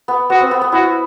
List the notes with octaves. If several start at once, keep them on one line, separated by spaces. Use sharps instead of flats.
B3
B3 F#4
C4
B3
B3
E4 F#4